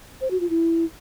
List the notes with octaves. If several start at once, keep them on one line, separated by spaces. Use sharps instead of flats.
C5
F#4
F4
E4